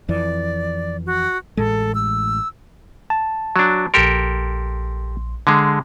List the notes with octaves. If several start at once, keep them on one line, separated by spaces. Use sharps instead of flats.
F2 E3 D5
F#4
A1 A2 G#3 A4
E6
A5
F#3 D4
A#1 G4 A4 A#4 C6
D3 G#3